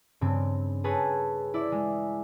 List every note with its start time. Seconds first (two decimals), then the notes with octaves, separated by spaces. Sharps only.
0.21 G2 C#3 C4
0.84 G#4 A4 B4 C#5
1.54 E4 D5
1.72 G#3